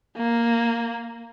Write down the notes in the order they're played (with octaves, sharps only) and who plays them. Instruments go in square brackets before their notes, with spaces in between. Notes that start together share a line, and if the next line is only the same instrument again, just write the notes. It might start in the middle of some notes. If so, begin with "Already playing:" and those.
[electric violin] A#3